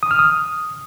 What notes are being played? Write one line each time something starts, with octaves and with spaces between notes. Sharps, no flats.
D#6
F6
D#6